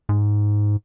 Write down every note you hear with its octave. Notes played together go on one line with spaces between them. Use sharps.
G#2